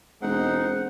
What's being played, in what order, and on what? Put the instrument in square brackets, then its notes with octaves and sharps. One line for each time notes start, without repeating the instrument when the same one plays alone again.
[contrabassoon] E1 [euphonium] G#3 [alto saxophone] C4 [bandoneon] D#4 F#5